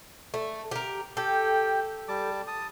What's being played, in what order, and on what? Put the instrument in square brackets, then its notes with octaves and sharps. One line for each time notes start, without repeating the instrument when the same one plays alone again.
[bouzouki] A3
G4 A#4
[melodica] G4 G5 [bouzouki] A4
[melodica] G3 A5 D6
A5 D#6